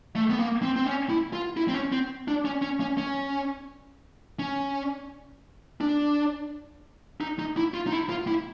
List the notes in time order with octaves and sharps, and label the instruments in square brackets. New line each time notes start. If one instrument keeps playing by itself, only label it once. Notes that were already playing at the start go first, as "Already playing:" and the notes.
[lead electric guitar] A3
B3
A#3
C4
C4
C#4
E4
F4
E4
C4
C#4
C4
D4
C#4
C#4
C#4
C#4
C#4
D4
D#4
D#4
E4
F4
D#4
E4
F4
E4